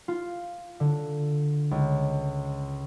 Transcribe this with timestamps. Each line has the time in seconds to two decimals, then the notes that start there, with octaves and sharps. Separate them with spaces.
0.08 F4
0.80 D3
1.71 C#2